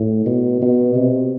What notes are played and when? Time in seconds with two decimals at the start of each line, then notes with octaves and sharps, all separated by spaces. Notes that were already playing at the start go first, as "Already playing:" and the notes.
Already playing: A2
0.26 B2
0.62 B2
0.96 C3